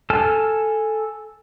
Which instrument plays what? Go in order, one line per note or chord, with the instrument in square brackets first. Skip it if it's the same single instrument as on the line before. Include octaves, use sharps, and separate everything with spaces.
[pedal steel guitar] A4 G#5 A5 F6